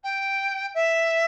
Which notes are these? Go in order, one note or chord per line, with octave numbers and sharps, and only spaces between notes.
G5
E5